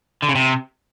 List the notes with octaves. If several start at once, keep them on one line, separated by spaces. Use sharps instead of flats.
D3
C#3
C3